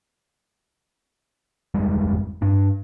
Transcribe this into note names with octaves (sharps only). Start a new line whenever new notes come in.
G1 F2 G3 G#3
G2 D4